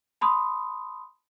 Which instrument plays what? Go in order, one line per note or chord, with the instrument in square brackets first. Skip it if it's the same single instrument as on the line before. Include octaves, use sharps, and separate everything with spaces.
[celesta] A5 B5 C6 D#6